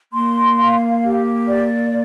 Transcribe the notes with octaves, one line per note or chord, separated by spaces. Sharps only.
A#3 C6
F5
G4
D5